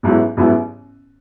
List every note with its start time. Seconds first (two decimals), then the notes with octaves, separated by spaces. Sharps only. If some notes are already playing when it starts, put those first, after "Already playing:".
0.03 A1 G#2 F#3 B3 E4
0.37 A1 G#2 F#3 B3 E4